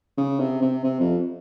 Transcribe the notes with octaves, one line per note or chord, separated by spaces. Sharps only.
C#3
C3
C3
C3
F2